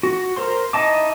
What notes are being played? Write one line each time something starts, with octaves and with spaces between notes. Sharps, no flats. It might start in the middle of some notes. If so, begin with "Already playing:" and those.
F#4
A#4 C5 C6
D#4 E4 D#5 A5 D6